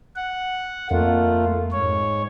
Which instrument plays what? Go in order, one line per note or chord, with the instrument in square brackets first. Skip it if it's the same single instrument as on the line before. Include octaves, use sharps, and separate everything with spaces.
[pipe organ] F#5
[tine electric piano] F2 [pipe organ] A3 A#3 F4
[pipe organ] G#2 C#5